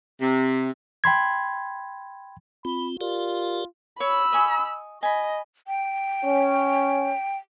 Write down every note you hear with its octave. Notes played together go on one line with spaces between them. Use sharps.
C3
G5 B5 C6 G#6
C4 F4 B5
F4 G4 A#4 D5
C#5 B5 E6
D#5 G#5 C#6
D#5 G#5 B5
G5
C#4